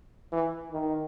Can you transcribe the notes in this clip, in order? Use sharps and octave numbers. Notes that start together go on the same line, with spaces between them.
E3
D#3